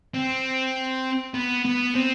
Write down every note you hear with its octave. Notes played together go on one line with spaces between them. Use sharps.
C4
B3
B3
C4